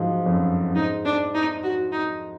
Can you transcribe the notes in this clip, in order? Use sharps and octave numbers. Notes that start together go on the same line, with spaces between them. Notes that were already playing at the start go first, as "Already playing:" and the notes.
Already playing: G#2 F3 F#3
F2
F#2
F#2
G#2 D#4
D4
D#4
F#4
D#4